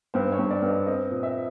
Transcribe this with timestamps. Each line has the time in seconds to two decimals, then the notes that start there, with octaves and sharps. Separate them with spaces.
0.14 G2 C5
0.32 C#5
0.39 G2
0.50 D5
0.62 G2
0.69 D#5
0.87 C4 D#5
1.11 A#2
1.23 E5